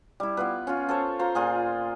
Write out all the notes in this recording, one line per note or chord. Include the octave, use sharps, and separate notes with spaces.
G3 E4
B3 F4 B4
C#4 F4
A4 C5 C#5
F4 C5 A#5
A#2 F4 G#4